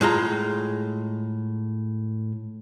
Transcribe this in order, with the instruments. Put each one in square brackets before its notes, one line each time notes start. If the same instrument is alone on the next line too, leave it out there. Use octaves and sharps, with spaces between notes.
[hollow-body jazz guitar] A2 G#3 F4 A#5